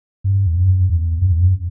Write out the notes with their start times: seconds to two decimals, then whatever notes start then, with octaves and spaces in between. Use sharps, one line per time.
0.24 G2
0.47 E2
0.57 F#2
0.89 E2
1.22 F#2
1.32 E2
1.42 F#2